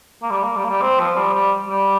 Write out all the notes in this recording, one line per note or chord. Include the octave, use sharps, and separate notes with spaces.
A#3
G3
A#3
G3
A#3
G3
C4
F3
G3
G3
G3